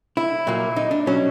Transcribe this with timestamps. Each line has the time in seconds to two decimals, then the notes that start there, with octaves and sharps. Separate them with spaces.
0.17 E4
0.47 A#2 F#3 A#3
0.76 D#4
0.91 D4
1.07 B2 F#3 C#4